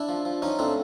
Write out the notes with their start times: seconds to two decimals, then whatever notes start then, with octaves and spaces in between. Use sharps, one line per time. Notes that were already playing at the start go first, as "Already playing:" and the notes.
Already playing: D4 E4
0.09 F3
0.25 F3
0.42 F3 C#4 D#4
0.59 A2 C4 D4